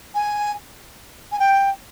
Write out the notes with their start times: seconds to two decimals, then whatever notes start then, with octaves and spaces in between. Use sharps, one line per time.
0.14 G#5
1.32 G#5
1.39 G5